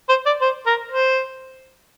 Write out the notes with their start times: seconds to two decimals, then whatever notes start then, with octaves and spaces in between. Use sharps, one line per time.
0.09 C5
0.26 D5
0.41 C5
0.67 A#4
0.92 C5